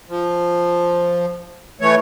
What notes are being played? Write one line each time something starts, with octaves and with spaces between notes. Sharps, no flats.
F3
E3 A3 C#5